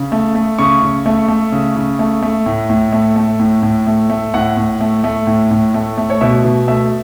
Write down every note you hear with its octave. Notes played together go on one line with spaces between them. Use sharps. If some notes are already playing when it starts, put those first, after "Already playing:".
Already playing: C#3
A3
A3
C#3 C#6
C#3
A3
A3
C#3
C#3
A3
A3
A2
A2
A3
A3
A2
A2
A3
A3
A2 F#5
A2
A3
A3
A2
A2
A3
A3
C#5
B2 E5
B2
A3 E5